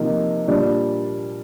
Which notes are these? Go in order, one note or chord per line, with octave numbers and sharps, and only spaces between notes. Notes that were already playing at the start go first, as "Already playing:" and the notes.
Already playing: C3 F3 A#3 D#4
A#2 G3 D4